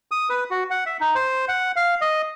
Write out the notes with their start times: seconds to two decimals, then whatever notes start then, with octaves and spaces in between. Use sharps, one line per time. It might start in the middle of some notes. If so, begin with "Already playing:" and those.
0.11 D#6
0.29 B4
0.50 F#4
0.70 F#5
0.86 E5
1.01 D#4
1.15 C5
1.48 F#5
1.76 F5
2.01 D#5